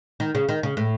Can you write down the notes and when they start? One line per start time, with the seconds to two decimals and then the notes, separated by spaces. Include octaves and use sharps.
0.20 D#3
0.35 C#3
0.49 D#3
0.63 C#3
0.77 A2